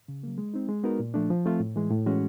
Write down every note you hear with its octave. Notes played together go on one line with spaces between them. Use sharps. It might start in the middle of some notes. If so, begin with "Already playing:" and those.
C#3
F#3 A#3
G#3
C4 D#4
G#3
B3 D#4 F#4 A#4
A#2
F3 A3 D4
F3
A3 C4 F4
A2
E3 G#3
A2
E3 G#3 C#4 F#4